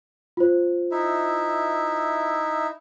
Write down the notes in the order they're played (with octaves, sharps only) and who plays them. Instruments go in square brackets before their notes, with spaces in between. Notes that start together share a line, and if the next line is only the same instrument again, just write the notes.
[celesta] F4 C5
[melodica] D#4 E4 E5